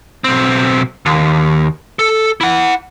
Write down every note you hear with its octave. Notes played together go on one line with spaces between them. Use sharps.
B1 C4
D#2
A4
E4 F#5